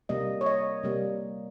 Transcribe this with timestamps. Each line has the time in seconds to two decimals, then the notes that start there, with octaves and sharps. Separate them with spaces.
0.09 C3 G3 A#3 D#5
0.41 C#5
0.46 D#5
0.83 C3 G3 A#3